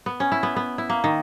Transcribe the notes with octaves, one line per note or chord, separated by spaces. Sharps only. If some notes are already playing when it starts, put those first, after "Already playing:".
B3
C#4
E4
B3
B3
E4
A#3
D#3